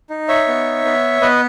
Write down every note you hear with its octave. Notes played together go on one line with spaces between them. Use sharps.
D#4
C#5 E5
B3
B3
B3 B4 D#5